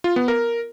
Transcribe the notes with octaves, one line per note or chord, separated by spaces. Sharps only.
F4
B3
A#4